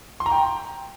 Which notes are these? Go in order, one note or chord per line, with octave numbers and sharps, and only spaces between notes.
C6
A#5
G5